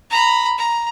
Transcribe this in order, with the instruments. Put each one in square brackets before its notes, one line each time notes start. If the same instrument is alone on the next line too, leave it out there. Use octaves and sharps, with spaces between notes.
[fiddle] A#5 B5
A#5